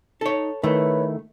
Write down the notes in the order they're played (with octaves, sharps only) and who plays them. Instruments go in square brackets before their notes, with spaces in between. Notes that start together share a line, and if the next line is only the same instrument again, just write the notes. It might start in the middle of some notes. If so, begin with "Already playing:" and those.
[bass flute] D#4 [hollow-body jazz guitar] A4 C#5
[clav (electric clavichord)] D#3 E4 [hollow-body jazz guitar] A3 [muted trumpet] B4 [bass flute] C#5